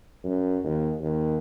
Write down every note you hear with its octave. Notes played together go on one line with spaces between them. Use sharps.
F#2
D#2
D#2